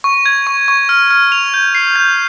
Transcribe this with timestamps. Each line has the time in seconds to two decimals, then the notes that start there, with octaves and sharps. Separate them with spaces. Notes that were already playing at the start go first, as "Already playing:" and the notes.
0.04 C#6
0.26 G#6
0.47 C#6
0.68 C#6
0.89 F6
1.11 F6
1.32 F7
1.54 G6
1.75 C7
1.96 G6